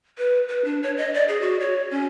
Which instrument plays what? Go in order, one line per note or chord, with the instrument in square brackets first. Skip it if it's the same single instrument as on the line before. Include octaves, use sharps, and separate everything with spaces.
[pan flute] B4
B4
D4
C#5
D#5
D5
G#4
F#4
C#5
C#4